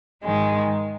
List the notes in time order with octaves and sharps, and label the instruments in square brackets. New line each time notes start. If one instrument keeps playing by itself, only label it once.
[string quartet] G#2 D#3 G#3